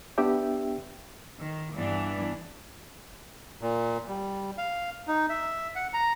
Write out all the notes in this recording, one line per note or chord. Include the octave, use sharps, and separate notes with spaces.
B3 D4 G4 E5 G5
D#3
G2 E3 B3 D4
A#2
G3
F5
D#4
E5
F#5
A#5